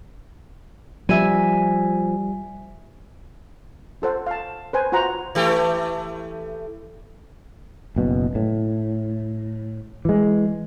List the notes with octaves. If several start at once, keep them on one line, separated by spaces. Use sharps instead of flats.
F3 G3 E5 G#5
F4 A4 C5 F#5
F5 A5
B4 C5 G#5
F4 F#4 C5 F#5 A#5
E3 A3 G4
F#1 B2
A2
E3 G#3